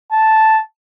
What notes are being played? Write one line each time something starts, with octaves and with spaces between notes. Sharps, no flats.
A5